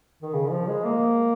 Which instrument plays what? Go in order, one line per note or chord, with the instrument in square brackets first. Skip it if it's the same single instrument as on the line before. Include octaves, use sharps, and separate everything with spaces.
[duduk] D#3
C#3
F3
G#3
A#3